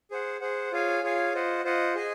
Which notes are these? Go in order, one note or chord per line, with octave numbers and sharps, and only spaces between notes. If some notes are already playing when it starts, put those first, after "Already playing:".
G#4 C5 F#5
G#4 C5 F#5
F4 G#4 C#5 F5 G#5
F4 G#4 C#5 F5 G#5
F4 C5 D#5 F#5
F4 C5 D#5 F#5
G#4 D#5 G#5